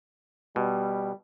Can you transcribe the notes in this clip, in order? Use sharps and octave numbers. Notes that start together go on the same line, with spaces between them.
B2 G3